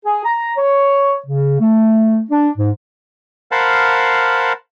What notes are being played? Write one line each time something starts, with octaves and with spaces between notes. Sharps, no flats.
G#4
A#5
C#5
C#3
A3
D4
G#2
A#4 C5 F5 F#5 A5 B5